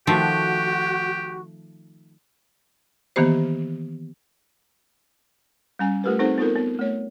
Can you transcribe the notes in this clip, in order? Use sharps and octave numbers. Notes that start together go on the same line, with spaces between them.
D#3 F3 A3 F#4 G4
D#3 E3 A#3 B3 G4 C5
G3 C#4 G#5
A3 F4 G4 A#4 B4
C4 D#4 A4 C5 F#5
B3 D#4 F4 A4 A#4
B3
A3 C#5